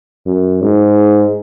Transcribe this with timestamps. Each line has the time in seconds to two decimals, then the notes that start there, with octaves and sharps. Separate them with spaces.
0.26 F#2
0.62 G#2